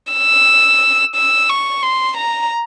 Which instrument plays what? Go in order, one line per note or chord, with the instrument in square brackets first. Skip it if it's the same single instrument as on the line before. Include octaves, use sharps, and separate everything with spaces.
[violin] E6
E6
C#6
C6
A#5